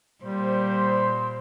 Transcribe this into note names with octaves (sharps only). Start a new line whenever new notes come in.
A#2 G3 C5